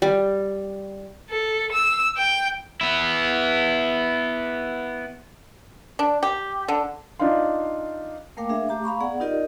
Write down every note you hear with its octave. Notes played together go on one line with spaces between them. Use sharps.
G3
A4
E6
G5
B3 E4
D4
G4
D3
D4 D#4 F4 F5 C6
A3 A#3 A#4 F5 G5 D6
D4 G#4 E5 F5
A3 G4 A#5 D6
F5 A#5 B5 C#6
B3 G#4 D5 F#5
D#4 F4 G4 A#4 D5 D#5